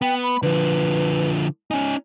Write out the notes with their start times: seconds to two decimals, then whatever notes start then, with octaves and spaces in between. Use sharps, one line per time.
0.02 B3 G5
0.23 B5
0.43 D3 F3 B4
1.71 C#4 D#4 G#5